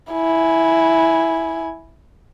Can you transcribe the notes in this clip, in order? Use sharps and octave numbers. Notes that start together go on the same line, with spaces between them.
E4 G#5